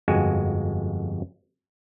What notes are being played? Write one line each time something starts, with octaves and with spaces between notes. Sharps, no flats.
G1 F2 G#3 F#4 F#5 G#5